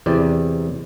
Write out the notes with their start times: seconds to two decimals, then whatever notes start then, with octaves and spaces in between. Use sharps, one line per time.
0.06 E2 C3 D5